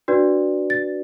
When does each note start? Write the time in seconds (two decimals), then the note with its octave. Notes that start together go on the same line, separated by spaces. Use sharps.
0.08 D4 F#4 B4 D5
0.70 A6